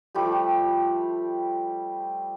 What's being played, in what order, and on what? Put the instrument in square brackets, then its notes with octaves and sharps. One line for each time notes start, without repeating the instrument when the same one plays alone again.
[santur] F3 G3 A3 G4